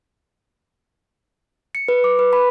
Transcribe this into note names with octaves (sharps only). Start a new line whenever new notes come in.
C#7
B4
D6
B4
B5